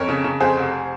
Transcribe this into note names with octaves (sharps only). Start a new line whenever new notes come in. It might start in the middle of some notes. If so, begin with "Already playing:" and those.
Already playing: F2 A#4 C#5
C#3
C#3
F2 G#4 C5
F1